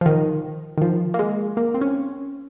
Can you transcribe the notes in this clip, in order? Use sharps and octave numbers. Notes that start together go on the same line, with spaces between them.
F3
D#3
D#3
F3
A#3
G#3
A#3
C4
C#4